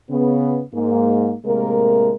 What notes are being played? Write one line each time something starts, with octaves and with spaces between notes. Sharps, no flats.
C#3 B3
G#2 A#3
A2 C3 G#3 A#3 A#4